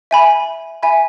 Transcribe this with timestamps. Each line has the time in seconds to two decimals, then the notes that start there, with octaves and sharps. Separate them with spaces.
0.11 E5 G#5 B5
0.83 E5 G#5 B5